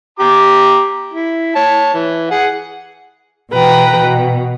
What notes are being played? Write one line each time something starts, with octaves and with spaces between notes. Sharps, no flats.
G4 A#5 D6
E4
C#5 A5
E3
G#4 F#5
B2 E3 B4 G5 A#5
B2